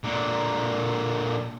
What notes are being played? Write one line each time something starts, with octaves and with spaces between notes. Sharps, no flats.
A#2 D3